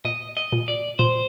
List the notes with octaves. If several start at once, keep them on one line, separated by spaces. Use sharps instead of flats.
A#2 D#5
D#5
A#2
D5
A#2 C5